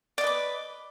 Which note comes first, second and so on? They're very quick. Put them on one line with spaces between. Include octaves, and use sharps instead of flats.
D5 D#5 B4 D6